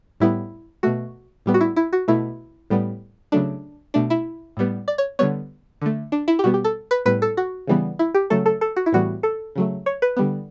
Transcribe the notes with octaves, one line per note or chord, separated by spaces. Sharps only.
A2 G3 B3 E4
B2 A3 F#4
A2 G3 B3
F#4
E4
E4
F#4
B2 A3 E4
A2 G3 B3
C#3 F#3 A3 D4
B2 A3 D4
E4
A2 G3 B3
D5
C#5
D3 G3 B3 C#5
D3 A3
D4
E4
G4
B2 G3 B3 F#4
G4
A4
B4
A2 G3 B3 B4
A4
F#4
C#3 E3 G3 B3
E4
G4
C#3 F#3 A3 A4
A4
A4
F#4
E4
A2 E3 G3 B3 F#4
A4
C#3 F#3 A3
C#5
B4
D3 G3 B3